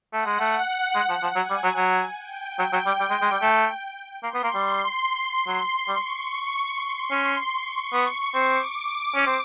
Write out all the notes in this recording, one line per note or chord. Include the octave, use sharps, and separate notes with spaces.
A3 F#5
G#3
A3
G#3
F3
F3
F#3 G#5
G3
F#3
F#3
G5
F#3
F#3
G3
G3
G#3
G#3
G3
A3
A#3 C6
B3
A#3
G3
F#3
G3 C#6
C6
C#4
C#6
B3
C4 D6
C#4
C4